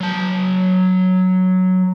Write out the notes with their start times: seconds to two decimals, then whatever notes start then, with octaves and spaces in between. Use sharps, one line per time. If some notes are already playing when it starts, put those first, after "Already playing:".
0.01 F#3 A5